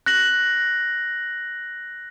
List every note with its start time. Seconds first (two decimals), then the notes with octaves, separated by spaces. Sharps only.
0.06 F#6 A#6 F#7